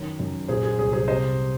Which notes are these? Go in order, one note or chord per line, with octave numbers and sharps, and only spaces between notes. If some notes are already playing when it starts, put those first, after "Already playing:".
Already playing: F#2 D#3 C#5
F#2
A#2 G#4 C5
G#4
C2 G#4
G#4 C5
C3 C5 D#5